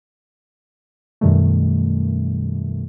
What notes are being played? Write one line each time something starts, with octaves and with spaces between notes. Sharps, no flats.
F#2 B2 D#3 G3 A3